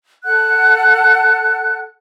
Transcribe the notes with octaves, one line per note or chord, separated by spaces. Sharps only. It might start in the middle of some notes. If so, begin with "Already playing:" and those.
A4 F#5 F#6